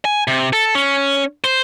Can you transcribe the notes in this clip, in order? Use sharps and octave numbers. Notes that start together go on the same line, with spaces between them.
G#5
C3
A4
C#4
C5